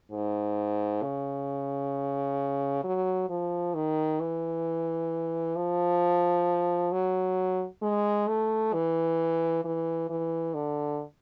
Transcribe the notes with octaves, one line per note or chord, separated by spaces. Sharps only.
G#2
C#3
F#3
F3
D#3
E3
F3
F#3
G#3
A3
E3
E3
E3
D3